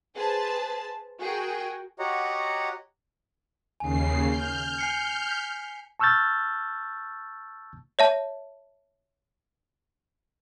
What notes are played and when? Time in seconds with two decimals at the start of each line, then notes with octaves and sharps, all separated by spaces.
0.15 G#4 B4 C5 A5
1.20 F#4 G#4 A#4 G5
1.99 F#4 G4 C#5 D#5 F#5 A#5
3.80 D#2 C#3 G#5 C7
4.28 F6 G6
4.78 G#5 C7 C#7
5.31 B6
6.00 A5 C#6 E6 F6 G6 A6
7.99 C#5 E5 A5